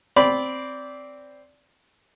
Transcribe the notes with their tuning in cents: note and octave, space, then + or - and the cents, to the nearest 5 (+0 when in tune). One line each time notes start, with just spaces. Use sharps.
C4 +0 D5 -15 B5 +0